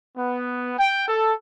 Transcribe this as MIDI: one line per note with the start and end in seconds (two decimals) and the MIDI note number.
0.17 0.74 59
0.79 1.06 79
1.08 1.33 69